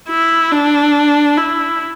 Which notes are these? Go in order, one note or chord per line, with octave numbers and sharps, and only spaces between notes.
E4
D4
E4